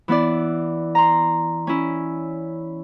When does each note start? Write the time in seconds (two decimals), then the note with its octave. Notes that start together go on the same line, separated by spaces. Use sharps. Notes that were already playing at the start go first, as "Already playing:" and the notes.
0.08 E3 B3 E4 D5
0.95 A#5 C6
1.67 C#4 E4